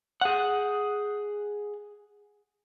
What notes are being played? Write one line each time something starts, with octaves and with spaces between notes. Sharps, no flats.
G#4 F#5